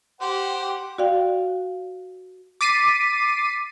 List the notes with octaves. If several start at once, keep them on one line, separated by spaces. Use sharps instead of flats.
G4 C5 F#5
F#4 D5 F5 G5
D6 A6 B6 C7 D#7